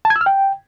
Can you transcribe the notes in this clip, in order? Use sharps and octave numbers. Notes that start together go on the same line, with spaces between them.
A5
G#6
E6
F6
G5